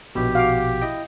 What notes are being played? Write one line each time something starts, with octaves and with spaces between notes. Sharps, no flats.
A#1 B2 G4
F#4 F5 D6
E4 D#5 G5